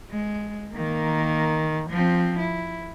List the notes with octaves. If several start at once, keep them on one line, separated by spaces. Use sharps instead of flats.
G#3
D#3 A#3
F3 C4
E4